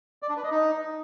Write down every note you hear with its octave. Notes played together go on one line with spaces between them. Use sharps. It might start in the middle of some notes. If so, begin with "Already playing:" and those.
D5
D4
B4
D#5
D#4